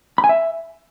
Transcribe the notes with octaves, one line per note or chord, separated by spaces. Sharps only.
B5
G#5
E5